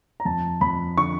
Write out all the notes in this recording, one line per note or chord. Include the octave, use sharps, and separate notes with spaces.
A#5
F2 A5
F2 B5
D3 C#6